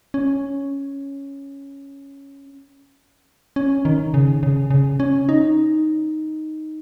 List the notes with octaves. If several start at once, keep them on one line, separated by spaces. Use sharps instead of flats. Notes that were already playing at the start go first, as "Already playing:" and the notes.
C#4
C#4
D#3
C#3
C#3
C#3
C#4
D#4